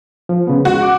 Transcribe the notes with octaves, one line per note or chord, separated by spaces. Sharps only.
F3
C#3 B3
G#3 F#4
D6